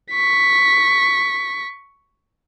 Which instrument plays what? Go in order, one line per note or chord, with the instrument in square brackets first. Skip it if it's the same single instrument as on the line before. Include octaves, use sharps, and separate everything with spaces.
[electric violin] C#6 B6